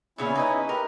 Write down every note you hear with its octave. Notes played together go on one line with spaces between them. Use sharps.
A#2 C#3 B3 C#4 E4
D#4 B4 D#5
G4 A#4 B4